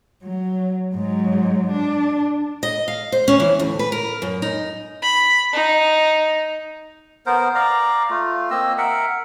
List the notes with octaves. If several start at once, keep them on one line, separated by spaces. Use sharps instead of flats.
F#3
G#2 F#3
D4
D#5
F5
C5
C#4
E3
D2
B4
A#4
F#2
D#4
B5
D#4
B3 A#4 C5
D5 F5 A#5
A3 F4
A#3 C4 D#5 E6
A#4 E5 F#5